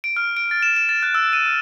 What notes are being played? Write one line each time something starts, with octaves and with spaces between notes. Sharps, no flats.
D7
F6
D7
A6
E7
E7
A6
F#6
E6
D#7
F6